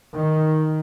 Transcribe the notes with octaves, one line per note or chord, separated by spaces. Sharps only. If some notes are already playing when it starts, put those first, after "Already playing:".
D#3